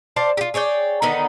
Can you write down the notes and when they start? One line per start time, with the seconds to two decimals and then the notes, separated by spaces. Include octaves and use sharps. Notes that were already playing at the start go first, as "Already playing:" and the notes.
0.16 C5 D5 F5 A5
0.37 F4 G4
0.54 G#4 C#5 D5 G5
1.02 D3 D#3 B3 D#4